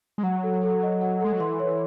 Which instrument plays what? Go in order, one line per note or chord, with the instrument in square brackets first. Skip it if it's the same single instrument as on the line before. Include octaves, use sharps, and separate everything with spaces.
[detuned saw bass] G#3
[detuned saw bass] F#3 [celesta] F#5
[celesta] A4
A4
D#5
F#5
[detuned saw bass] G#3 [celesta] A4
[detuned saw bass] F#3
[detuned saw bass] E3 [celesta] C6
[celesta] C#5